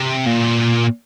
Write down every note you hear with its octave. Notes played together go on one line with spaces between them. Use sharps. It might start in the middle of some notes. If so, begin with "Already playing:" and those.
Already playing: C3
A#2